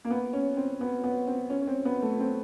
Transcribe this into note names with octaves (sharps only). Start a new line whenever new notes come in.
A#3
B3
C#4
C4
B3
B3
C4
C#4
C#4
C4
B3
A3
C4